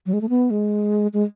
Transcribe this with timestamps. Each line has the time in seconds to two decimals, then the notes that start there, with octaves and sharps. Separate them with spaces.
0.06 F#3
0.13 G#3
0.21 A3
0.29 B3
0.51 G#3
1.13 G#3